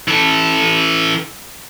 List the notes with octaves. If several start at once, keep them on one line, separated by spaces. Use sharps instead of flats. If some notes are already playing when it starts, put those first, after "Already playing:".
E3 A4